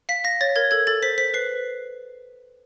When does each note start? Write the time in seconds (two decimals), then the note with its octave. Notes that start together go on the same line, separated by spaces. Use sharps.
0.09 F5 B6
0.24 F5 A#6
0.41 C#5 A6
0.56 A#4 G#6
0.71 A4 G#6
0.87 A4 A6
1.03 C5 B6
1.18 C5 B6
1.34 B4 C7